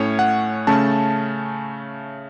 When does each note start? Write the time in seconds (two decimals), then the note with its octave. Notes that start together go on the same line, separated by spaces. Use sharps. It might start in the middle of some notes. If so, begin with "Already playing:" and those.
Already playing: A2 A3 C#4 C#5
0.19 F#5
0.67 C#3 A3 C#4 A5